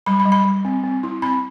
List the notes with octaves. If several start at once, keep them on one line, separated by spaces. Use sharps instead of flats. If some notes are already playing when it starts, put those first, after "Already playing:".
G3 B5
B5
G3
B5
G3
C4
C4
E4
C4 B5